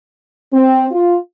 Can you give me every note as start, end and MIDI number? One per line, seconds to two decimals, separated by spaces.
0.52 0.86 60
0.91 1.16 65